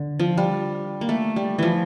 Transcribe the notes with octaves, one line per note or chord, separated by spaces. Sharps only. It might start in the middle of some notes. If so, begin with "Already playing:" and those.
Already playing: D3
F3
G3
A#3
A3
G3
E3 F3